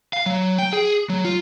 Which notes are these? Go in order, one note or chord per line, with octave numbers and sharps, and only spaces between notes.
F5
F#3
G5
G#4
F#3
F4